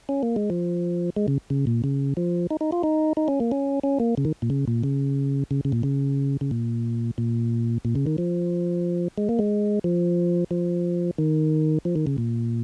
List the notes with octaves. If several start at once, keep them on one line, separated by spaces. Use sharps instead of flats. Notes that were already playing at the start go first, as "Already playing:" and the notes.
C#4
A#3
G#3
F3
G#3
C#3
C#3
A#2
C#3
F3
D#4
D#4
F4
D#4
D#4
C#4
A#3
C#4
C#4
A#3
C#3
D#3
A#2
C#3
A#2
C#3
C#3
C#3
A#2
C#3
C#3
A#2
A#2
A#2
C#3
D#3
F3
G#3
A#3
G#3
F3
F3
D#3
F3
D#3
C#3
A#2